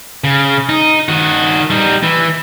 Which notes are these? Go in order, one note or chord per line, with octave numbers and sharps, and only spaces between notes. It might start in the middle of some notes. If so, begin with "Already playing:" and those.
C#3
D#4
D#3 F#4
G3 D#4
E3